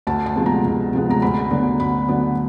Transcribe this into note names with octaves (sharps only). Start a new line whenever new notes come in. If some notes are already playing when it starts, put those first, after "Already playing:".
D2 A5
A5
C3 F3 G#3 B3
A#5
D2
C3 F3 G#3 B3
A#5
D2 B5
D3 F#3 B3 D4
D2 B5
D3 F#3 B3 D4